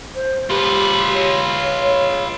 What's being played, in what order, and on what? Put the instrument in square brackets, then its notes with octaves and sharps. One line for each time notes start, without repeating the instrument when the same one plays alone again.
[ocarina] C5
[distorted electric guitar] F4 B4 [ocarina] G4
[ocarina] C#5